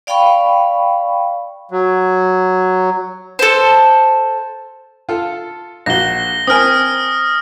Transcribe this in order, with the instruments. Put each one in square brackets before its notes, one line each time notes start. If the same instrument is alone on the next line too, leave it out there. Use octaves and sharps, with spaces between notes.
[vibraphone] D5 F5 G5 B5 C#6
[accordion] F#3
[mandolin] A4 C5
[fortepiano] F4 A4
[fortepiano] A#1 F#4 [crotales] A#6 G7
[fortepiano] C4 A#4 G#5 [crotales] D#6 F6